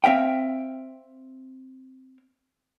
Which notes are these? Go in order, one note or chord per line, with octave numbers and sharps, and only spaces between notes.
C4 E5 F5 G5